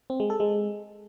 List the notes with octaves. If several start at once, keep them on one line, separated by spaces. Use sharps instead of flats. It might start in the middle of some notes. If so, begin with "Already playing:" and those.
C4
G#3
A4
G#3